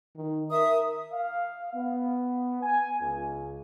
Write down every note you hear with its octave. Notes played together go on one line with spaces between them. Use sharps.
D#3
A#4 E5 D#6
F5
B3
G#5
C#2